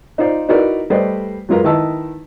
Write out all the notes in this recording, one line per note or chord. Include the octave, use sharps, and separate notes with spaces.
D#4 F4 C5 D5
D#4 E4 F#4 A#4 B4 D5
G3 A3 B4 C5 D5 D#5
F#3 G#3 F4 A#4 B4
D#3 E4 B4 D#5 A5 E6